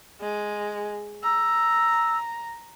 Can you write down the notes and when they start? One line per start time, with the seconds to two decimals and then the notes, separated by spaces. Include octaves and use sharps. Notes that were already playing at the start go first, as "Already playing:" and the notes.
0.21 G#3
1.23 A#5 E6